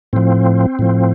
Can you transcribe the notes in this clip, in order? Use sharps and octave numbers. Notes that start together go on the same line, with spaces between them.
A2 F3 C4
A2 F3